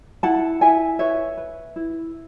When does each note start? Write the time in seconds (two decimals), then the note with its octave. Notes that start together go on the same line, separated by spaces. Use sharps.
0.23 E4 F#5 A5
0.61 E4 E5 G#5
0.99 B4 C#5 E5
1.37 B4
1.76 E4